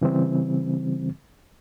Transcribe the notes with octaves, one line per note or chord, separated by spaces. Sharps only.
C#3 E3 G3 C4